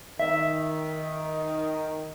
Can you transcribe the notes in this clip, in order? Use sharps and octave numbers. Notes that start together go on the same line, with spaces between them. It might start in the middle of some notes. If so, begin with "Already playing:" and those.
D#3 E5